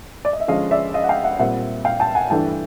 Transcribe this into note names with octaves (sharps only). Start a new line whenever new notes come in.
D5
D#5
E5
D3 F3 G#3 C#4 D#5 F5
D5 E5
D#5 F5
F#5
F5 G5
E5 F#5
A#2 G3 C4 E5 F#5
F5 G5
G5 A5
F#5 G#5
G2 E3 A3 D4 G5 A5